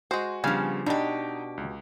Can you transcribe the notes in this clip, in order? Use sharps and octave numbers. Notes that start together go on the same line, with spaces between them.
G#3 F#4 C5
C#3 F3 G3 B3 D4 G#5
B2 D4 D#4 G4 D#5
C#2